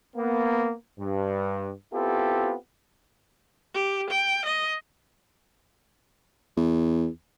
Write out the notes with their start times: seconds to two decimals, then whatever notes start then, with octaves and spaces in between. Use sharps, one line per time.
0.16 A#3 B3
1.00 G2
1.93 B3 C4 E4 F4 G4 A4
3.74 G4
4.10 G5
4.46 D#5
6.57 E2